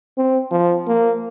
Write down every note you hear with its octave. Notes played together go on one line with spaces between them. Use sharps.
C4
F3
A#3